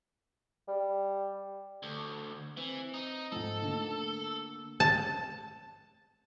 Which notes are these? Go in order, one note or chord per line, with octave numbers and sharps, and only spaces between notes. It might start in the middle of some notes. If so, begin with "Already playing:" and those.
G3
D2
E3 C4
D#4
G#2 F3 A4
D3 A3 A#3
A5